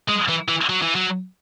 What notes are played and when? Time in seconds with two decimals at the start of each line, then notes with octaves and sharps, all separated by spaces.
0.08 G#3
0.29 E3
0.49 E3
0.70 F#3
0.82 E3
0.95 F#3